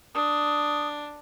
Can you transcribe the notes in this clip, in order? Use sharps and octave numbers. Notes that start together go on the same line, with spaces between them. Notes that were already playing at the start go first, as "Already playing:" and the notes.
D4 D#6